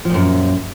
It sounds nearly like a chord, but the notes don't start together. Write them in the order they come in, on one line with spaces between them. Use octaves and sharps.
F3 A#2 F#2